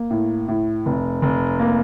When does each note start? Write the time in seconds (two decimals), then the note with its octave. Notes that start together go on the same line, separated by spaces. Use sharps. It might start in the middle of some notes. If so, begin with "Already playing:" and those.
Already playing: A#3
0.10 A2
0.48 A2
0.86 F1
1.22 F1
1.59 A#3